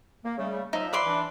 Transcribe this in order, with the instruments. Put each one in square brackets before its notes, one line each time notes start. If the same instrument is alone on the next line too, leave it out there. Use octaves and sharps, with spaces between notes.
[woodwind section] A#3
C#3 G3 A3
[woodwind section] F3 F#3 E5 [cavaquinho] D#4
[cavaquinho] B4 D5 C6
[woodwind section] E3 D4